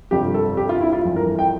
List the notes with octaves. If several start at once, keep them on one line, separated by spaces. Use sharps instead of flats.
G1 F2 C3 G4
A4
G4
F4
E4
F4
G1 F2 E3
A#4
G5